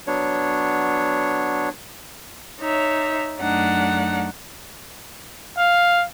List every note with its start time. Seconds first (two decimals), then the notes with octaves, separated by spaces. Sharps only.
0.07 F#3 B3 D4 C#5
2.60 D#4 C#5 E5
3.39 F#2 A3 D4 D#4 F#5
5.57 F5